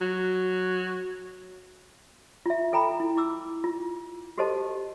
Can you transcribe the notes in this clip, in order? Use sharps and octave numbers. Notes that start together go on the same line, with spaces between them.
F#3
F4 E5
F4 A4 G5 A#5 B5
E4
E4 D6 E6
F4
F#4 G4 A4 C5 D#5 A5